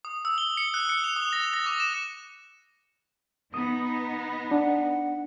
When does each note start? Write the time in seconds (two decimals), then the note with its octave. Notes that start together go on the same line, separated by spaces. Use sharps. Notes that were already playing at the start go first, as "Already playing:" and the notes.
0.05 D#6
0.25 E6
0.38 G7
0.57 C#7
0.74 F#6
0.89 C#7
1.04 F7
1.16 D#6
1.33 A#6
1.53 A#6
1.66 D6
1.80 E7
3.54 B3 D#4 D#6
4.51 D4 F#5